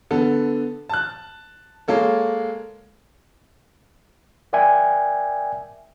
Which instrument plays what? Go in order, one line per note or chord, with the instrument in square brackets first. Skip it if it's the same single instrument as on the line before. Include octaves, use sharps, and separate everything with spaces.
[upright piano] D3 B3 A4
A5 F#6
G#3 A#3 A4 C#5
[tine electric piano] A#4 D5 E5 G5 G#5